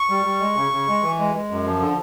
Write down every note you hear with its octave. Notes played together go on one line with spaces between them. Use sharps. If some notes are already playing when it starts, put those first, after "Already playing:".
Already playing: C#6
G3
G3
G#3
C#3
C#3
G#3
E3
G#3
G#3
F#2
F3
D3